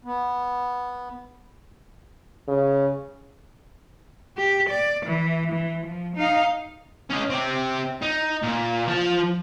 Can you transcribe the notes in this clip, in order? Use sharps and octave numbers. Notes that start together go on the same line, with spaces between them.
B3
C#3
G4
D5
E3
E3
F3
D#4 F5
C#4 D#5
C4 G4
D#4
A#2
F3 A5